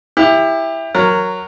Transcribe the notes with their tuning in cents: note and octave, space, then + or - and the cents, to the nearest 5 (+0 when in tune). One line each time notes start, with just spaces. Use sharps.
E4 +0 G4 +25
F#3 +0 A#4 +0